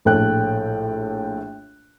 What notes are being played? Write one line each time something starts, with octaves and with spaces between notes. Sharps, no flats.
A#1 A2 A4 G5 F#6